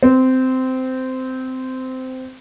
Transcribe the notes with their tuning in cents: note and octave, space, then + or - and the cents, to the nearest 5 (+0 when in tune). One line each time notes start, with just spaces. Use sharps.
C4 -15